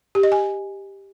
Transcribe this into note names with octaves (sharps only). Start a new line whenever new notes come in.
G4
D#5
G#5